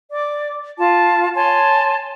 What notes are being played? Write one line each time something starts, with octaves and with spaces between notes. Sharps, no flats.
D5 D6
F4 A5
C#5 G#5 A5 C6